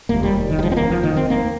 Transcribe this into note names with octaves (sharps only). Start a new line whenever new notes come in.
F1 D#2 A#3
G3
D#3
G3
F3
C4
A#3
F3
D#3
C4
A#3